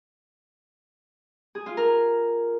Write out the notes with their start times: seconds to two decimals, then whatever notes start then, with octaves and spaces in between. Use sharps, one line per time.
1.55 G#4
1.66 F4
1.77 A#4